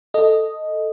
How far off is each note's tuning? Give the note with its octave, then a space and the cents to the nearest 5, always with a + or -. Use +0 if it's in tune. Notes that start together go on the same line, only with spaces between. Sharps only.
A4 +0 D#5 +0